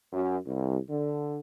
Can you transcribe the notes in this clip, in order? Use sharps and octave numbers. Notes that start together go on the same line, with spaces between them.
F#2
C2
D3